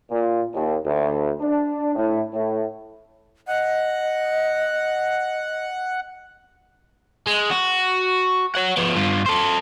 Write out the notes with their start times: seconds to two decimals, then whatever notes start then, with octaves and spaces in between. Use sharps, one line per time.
0.11 A#2
0.54 D#2
0.84 D2
1.41 D4
1.96 A2
2.34 A2
3.48 D#5 F#5
7.27 G#3
7.51 F#4
8.55 C#5 F#5
8.77 F3 B3
8.96 G2 F4
9.26 A4 C5